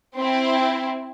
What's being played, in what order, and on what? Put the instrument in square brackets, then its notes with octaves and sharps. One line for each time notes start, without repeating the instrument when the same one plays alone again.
[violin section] C4 E4